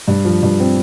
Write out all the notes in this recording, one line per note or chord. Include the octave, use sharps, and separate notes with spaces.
G2
F3
G2
C4